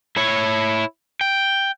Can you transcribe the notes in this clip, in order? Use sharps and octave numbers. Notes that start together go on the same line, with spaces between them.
E4 C#5
G5